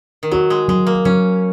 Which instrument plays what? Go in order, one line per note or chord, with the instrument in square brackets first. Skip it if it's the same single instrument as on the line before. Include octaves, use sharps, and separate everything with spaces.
[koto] D#3
[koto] F#3 [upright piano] F#4
[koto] G#3
[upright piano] F#3 [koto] G#3
[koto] A#3
[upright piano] F#3 [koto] C#4